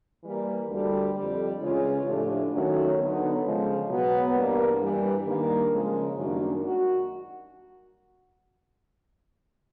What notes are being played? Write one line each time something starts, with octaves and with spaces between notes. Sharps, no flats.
E3 G3 A#3
D2 D3 G3
F2 D3 G3
C#3 E3 G#3 C#4 F4
A2 F3 A3 D4 G4
D#3 F#3 A3 C#4 F#4
D3 F#3 B3 D#4
C#3 F3 G#3
B2 F#3 B3
G2 E3 G3 A#3
G2 E3 G3
D#3 G3 A#3 D4
C#3 F3 G#3
F#2 D#3 G3 A#3 D4
F#4